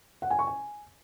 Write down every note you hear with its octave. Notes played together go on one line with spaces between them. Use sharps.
F#5
G#5
C#6
G#5